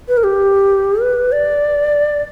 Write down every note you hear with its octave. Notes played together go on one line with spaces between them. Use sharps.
B4
A#4
G4
B4
D5